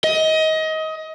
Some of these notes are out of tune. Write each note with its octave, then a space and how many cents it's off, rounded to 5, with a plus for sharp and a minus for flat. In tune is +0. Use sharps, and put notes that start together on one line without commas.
D#5 +25